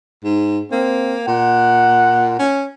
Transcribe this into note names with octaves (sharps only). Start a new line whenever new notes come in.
G#2
A#3 C4
A#2 F#5
C#4